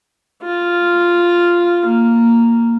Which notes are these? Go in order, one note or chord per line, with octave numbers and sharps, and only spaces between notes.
F4
A#3